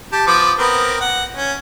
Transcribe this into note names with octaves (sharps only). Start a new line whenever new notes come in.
G4 A5
F3 B3 D6
B3 C4 A#4
F#5
C#4